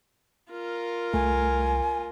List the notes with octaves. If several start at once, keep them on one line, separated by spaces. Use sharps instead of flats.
F4 A#4
C2 A3 G#5